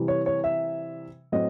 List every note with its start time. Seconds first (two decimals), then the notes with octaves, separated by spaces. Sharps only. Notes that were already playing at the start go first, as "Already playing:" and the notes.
Already playing: C3 E3 G3
0.08 C#5
0.26 C#5
0.44 E5
1.32 A2 F#3 A3 C4 D#5